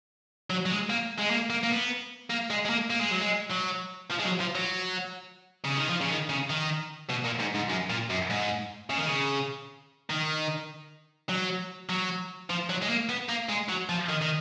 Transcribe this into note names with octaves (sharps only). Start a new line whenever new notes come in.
F#3
F#3
G#3
A#3
G#3
A#3
A#3
A#3
B3
A#3
G#3
G#3
A#3
A#3
G#3
F#3
G#3
F#3
F3
G#3
F#3
F3
F#3
C#3
D#3
F3
C#3
D#3
C#3
D#3
B2
A#2
G#2
G#2
F#2
A#2
F#2
G#2
C#3
D#3
C#3
D#3
F#3
F#3
F3
F#3
G#3
A#3
B3
A#3
G#3
F#3
F3
D#3
D#3